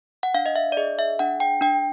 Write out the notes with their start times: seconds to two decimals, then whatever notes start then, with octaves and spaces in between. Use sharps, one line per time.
0.23 F#5
0.34 D4 F5
0.46 D#5
0.56 E5
0.72 D5
0.77 G#4 D#5
0.99 E5
1.19 D4 F#5
1.40 G5
1.61 D4 G5